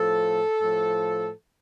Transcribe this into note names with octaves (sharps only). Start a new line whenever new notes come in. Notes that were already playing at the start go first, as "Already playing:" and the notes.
Already playing: A2 F3 A4
A2 F3